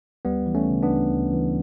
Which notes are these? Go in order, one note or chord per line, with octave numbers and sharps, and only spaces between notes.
D2 G3 B3
E3
A3 C#4
C#3
B3 D4
D2
D2
E3